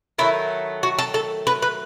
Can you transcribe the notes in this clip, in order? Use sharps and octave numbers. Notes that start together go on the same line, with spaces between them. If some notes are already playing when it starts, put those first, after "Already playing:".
D#3 F#3 A3 E4
F#4
A4
A4
B4
B4